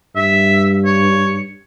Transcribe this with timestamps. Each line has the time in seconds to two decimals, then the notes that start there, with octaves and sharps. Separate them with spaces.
0.16 G2 E5
0.85 C#5